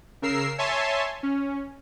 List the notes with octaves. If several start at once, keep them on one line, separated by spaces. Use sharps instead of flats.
C#3 A#4 E6 C7
C#5 E5 G#5 A5 C6
C#4